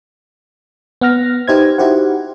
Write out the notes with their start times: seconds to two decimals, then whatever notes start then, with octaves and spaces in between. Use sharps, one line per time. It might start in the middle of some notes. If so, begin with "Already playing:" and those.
1.01 B3 F#5 F6 A#6
1.48 D#4 G4 B4 C5 E5 G#6
1.78 D#4 E4 F#4 G4 C5 F#5